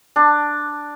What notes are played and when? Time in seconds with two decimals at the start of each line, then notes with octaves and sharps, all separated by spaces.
0.16 D4